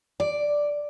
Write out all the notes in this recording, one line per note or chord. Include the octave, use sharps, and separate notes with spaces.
D5